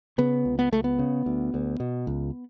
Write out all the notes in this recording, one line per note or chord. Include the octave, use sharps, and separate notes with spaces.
C#3 B3
C#2
B3
C#2 A3
B3
C#3
D2
D2
B2
C#2